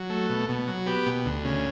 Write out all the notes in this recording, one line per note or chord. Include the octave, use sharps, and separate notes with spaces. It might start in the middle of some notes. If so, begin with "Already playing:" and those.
Already playing: F#3
A3
B2
B2
F#3
B3 G4
B2
D2
C#3